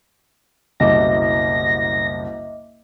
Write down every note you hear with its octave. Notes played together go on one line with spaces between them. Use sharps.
F#1 C2 B2 D#5 E5 D6 A#6